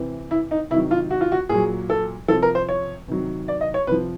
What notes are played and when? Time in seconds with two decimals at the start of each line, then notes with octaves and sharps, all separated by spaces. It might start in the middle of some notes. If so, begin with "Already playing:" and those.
Already playing: C3 E3
0.31 E4
0.51 D#4
0.70 C3 D#3 F#3 E4
0.91 F4
1.11 F#4
1.21 F4
1.32 F#4
1.49 A#2 F#3 G#4
1.90 A4
2.28 C3 F3 A4
2.42 A#4
2.55 C5
2.69 C#5
3.08 C3 D#3 F#3
3.48 D5
3.61 D#5
3.74 C#5
3.87 C3 F3 B4